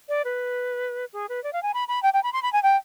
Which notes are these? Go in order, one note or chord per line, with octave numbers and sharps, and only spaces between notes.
D5
B4
G#4
B4
D5
F5
G#5
B5
B5
G5
G5
B5
C6
B5
G#5
G5